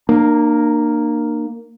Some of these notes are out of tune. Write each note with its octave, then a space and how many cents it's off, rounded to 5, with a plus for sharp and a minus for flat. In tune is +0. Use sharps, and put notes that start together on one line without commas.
A#3 +0 D4 +45